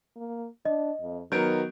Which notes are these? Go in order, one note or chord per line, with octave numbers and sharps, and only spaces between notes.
A#3
D4 D#5
F2
D#3 F#3 B3 A#4 G6 D7